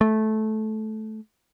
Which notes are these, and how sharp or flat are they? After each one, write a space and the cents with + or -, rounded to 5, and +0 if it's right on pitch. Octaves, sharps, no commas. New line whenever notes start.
A3 -15